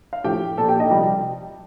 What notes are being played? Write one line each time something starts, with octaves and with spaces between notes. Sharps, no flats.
F5
A2 F3 G4 G5
A#2 F3 A4 A5
G4 G5
D#4 D#5
C3 F3 G3 G4